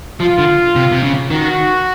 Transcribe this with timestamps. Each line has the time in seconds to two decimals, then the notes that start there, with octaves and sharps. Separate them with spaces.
0.20 F3 F4
0.38 D3
0.76 C3
0.92 C3
1.03 C#3
1.30 D#3 F#4